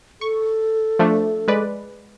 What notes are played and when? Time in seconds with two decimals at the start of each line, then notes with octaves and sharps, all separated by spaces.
0.21 A4 C#6
0.99 F3 A3 D4
1.48 G#3 B4 D5